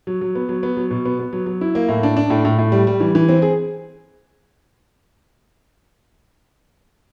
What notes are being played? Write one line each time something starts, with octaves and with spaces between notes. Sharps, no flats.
F#3
F#3
B3
F#3
B3
F#3
B2
B3
B3
F#3
F#3
E4
A#3
A2
D4
D4
A2
A2
A2
G3
G3
E3
E3
C4
G#4